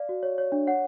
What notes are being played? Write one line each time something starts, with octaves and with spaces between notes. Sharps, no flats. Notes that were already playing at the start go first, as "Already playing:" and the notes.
Already playing: D5 F5
F#4
C#5
C#5
D4
C#5 F#5